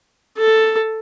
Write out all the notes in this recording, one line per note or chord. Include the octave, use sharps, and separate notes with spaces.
A4